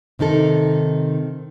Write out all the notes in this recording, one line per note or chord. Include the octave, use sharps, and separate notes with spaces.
C3 D#3 D#4 A4